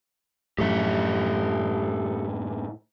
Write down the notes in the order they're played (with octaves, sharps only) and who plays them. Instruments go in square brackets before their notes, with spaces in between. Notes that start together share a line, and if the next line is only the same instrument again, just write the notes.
[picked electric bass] F#2 A2 [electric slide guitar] G4 A4 E5